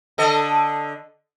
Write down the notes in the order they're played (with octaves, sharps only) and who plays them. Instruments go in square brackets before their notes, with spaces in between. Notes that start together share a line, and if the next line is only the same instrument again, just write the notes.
[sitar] D3 A4 D#5